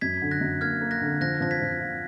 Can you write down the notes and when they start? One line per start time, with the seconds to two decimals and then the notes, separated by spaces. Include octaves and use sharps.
0.01 F#2 G#6 B6
0.22 D3
0.31 F#6 A#6
0.41 F#2
0.61 A#3 F6 G#6
0.81 A#3
0.91 F#6 A#6
1.01 D3
1.21 F3 F#6 A#6
1.41 F3 A#6
1.51 G#6 B6
1.61 F3
1.81 F4